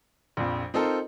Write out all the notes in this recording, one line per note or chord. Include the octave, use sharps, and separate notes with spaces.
A#1 F2
C4 D#4 F4 A4 A#4 C5